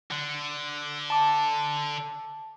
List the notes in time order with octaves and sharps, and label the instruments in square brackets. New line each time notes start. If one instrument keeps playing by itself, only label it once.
[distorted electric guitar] D3
[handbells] A5 D6